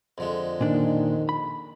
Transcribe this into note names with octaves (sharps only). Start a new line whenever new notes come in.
F2 D3 G#3
A#2 D#3 D4
B5